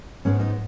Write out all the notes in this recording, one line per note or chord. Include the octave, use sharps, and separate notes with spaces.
G#2 G#3 B3 C#4 C#5
D#4 D#5